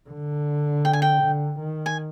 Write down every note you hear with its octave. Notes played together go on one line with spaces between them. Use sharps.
D3
G5
G#5
G5
D3
D#3
G#5